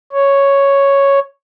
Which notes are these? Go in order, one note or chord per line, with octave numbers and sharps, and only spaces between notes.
C#5